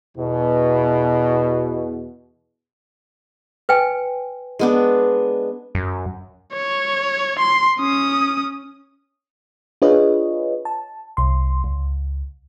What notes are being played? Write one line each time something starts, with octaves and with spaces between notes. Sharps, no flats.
E2 B2
B4 G5 G#5
G#3 B3 D4
F#2
C#5
C6
C#4 D#6
D4 F4 G#4 B4 C#5 D#5
A5
C2 C6
C#2